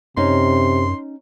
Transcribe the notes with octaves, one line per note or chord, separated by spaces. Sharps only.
F#2 C3 C#4 D#4 C6